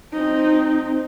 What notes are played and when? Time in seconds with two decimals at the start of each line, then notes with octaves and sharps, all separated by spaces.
0.13 C4 D#4